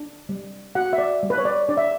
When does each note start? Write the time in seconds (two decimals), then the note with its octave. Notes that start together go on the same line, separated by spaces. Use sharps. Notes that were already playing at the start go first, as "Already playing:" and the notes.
Already playing: D4
0.29 G3
0.75 F#4 F#5
0.93 E5
0.98 D5
1.23 G3
1.30 B4
1.38 C#5
1.45 D5
1.69 D4 D5
1.77 E5